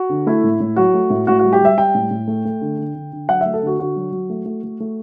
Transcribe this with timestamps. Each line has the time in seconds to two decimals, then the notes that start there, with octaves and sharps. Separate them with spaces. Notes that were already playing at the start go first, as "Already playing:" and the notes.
Already playing: F#4
0.09 D3
0.27 A3 E4
0.43 A2
0.60 A2
0.76 F#3 F#4
0.94 A3
1.10 A2
1.27 A2 F#4
1.39 G3 F#4
1.53 G4
1.61 G3 E5
1.77 G3 G5
1.94 A2
2.11 A2
2.28 A3
2.45 A3
2.61 D3
2.78 D3
2.95 D3
3.12 D3
3.29 F#3 F#5
3.41 A3 E5
3.54 A4
3.62 D3 F#4
3.79 D3 F#4
3.96 F#3
4.12 F#3
4.30 A3
4.46 A3
4.64 A3
4.80 A3